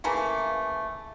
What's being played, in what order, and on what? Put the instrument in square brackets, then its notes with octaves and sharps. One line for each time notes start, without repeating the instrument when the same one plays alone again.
[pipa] C#3 E3 A3 A#3